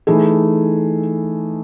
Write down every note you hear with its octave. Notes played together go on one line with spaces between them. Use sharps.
E3 A3 D#4 G#4